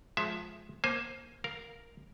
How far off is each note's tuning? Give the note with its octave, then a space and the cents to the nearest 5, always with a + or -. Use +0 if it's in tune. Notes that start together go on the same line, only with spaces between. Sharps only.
F3 +20 G#3 +25 E5 +10
A#3 +15 C5 +15 G#5 +0
A#4 +0 F5 +0